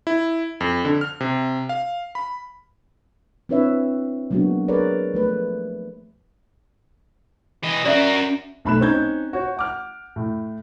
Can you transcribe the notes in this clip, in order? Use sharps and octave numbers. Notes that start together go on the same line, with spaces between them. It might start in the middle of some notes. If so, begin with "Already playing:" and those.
E4
F2
D3
F6
C3
F5
B5
C4 D4 E4 B4 C#5 E5
F#3 G#3 A#3 B3 D4 F#4
G#4 A#4 B4 C#5 D5
F3 A3 B4
E3 D#5
C#4 F#4 A#4 D5 E5
B1 A3 B5 F#6 E7
C4 C#4 D#4 G6 G#6
F#4 C#5
F#5 D6 F6
A2